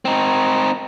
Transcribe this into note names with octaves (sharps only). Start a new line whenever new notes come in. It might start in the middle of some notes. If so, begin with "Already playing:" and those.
C4 D#4